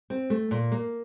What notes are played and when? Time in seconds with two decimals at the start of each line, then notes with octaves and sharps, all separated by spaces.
0.10 C4
0.30 A3
0.51 A#2
0.72 A#3